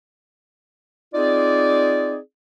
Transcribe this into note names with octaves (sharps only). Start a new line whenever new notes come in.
C4 D#4 F4 G#4 D5